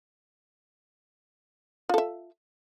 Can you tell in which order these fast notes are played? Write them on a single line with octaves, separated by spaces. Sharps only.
F4 A4 E5